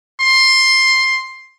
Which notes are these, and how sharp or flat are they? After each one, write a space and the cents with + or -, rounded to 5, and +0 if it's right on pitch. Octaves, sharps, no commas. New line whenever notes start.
C6 +10